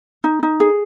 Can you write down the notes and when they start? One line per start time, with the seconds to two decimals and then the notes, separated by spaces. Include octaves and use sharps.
0.24 D#4
0.43 D#4
0.60 G#4